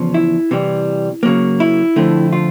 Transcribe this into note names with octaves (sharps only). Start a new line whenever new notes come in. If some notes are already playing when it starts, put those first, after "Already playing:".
Already playing: E2 C#3 F3
E4
C3 E3 G3
C#3 F#3 A#3
E4
F2 D3 F3 A3 C4
F4